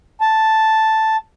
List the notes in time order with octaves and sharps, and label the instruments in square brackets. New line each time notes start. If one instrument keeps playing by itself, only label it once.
[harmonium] A5